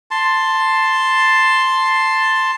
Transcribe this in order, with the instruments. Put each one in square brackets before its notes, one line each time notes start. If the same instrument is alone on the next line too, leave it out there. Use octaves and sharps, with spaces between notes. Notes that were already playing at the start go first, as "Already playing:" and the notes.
[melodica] A5 C6